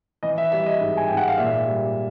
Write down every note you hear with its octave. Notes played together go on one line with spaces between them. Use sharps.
E3 D#5
E5
G3 E5
D#5
G#2
G#5
G#2 G5
F#5
F5
A#2 E5
G3